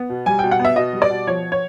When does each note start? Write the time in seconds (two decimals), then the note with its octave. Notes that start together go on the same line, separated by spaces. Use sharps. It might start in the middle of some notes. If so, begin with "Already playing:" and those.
Already playing: B3
0.09 B2
0.26 G3 G#5
0.39 B2 G5
0.51 F#5
0.59 B3
0.65 E5
0.76 B2 D#5
0.93 G3
1.02 D5
1.10 B2
1.27 F3 C#5
1.52 C#5